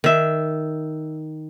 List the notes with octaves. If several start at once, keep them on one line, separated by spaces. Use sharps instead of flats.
D#3 E5